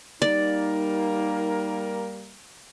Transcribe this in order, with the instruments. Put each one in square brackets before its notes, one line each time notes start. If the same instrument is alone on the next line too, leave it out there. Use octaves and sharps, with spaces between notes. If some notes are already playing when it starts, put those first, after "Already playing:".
[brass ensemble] G3 A#3 A#4 [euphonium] D#4 [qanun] D5